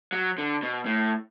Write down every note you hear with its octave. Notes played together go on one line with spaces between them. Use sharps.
F#3
D3
B2
A2